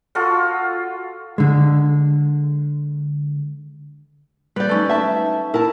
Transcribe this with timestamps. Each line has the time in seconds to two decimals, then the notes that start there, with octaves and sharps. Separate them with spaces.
0.15 F4 F#4 A4 F#5
1.38 D3 G#3
4.56 G3 B4 D5 G6
4.69 A3 C#4 D#4
4.89 E5 A5
5.54 E4 A#4 A5